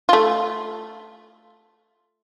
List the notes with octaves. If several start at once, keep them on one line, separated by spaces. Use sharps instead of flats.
A3 F4